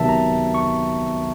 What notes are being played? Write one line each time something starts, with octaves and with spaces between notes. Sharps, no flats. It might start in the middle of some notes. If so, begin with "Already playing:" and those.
Already playing: C#2 C3 D#3 F#3 B3 E5 A5
A#5
C#6